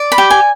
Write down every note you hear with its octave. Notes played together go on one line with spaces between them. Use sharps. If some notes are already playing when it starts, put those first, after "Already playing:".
Already playing: D5
B5
G4
G#5